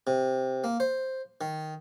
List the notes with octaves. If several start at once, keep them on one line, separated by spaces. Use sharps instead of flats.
C3
A#3
C5
D#3